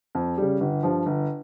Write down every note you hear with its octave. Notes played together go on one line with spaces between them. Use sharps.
F2
C#3 G3
G1
G2 F3
G1